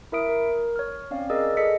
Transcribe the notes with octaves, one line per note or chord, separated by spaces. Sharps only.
E4 A#4 E5 D#6 D7
A#4
C#5 F6
C4 C#4 D5 F5
G#4 A#4 D5 D#5 E6
G#4 A4 D#5 B6 C#7